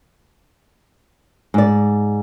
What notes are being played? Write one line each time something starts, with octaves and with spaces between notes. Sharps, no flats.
G#2 D5